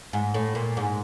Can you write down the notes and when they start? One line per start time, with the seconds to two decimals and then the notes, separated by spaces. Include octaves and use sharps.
0.13 G#2
0.34 A2
0.55 A#2
0.77 G#2